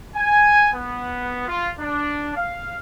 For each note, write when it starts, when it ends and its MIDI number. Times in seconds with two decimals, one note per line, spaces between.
0.15 0.68 80
0.74 1.44 59
1.46 1.69 65
1.78 2.34 62
2.36 2.79 77